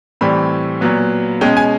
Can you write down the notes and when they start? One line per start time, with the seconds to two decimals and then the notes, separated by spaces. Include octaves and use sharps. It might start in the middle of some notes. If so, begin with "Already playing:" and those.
0.21 A2 E3 G3 C4 B5
0.81 A#2 F#3 B3
1.41 B2 G#3 C#4 G5
1.57 G#5